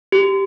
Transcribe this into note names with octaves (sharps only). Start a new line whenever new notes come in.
G4